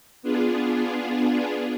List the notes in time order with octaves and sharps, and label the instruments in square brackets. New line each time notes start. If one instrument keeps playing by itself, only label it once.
[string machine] B3 D4 F4 G#4